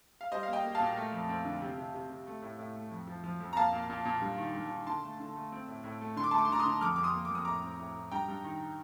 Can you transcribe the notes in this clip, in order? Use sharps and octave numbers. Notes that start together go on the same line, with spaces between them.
F5
G3 C5 D#5
A#3 F5
D#5 G5
A#3
F5 A5
A#2
A3
F2
C4
D3
C3
C3
C3
C3
A3
A2
A2
A3
F2
F3
F3
F2
A#5
A#3 F5 A5
A#2
A#2
A#2
G2
D#3
G2
D#3
D3 A5 C6
A3
D3
A3
C4
A2
A2
A3
D3 C6
D6
A3 A5 C6
D6
C6
D3 A#5 D6
C6 D#6
D3
F2 D6 F6
F2 D6
C6 D#6
A#3
D6
F2 D#6
A2 A#5 D6
C4
A2
A2
G2 G5 A#5
G2
D#3